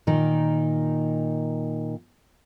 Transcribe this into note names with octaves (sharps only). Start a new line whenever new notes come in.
A#2 D#3 D#4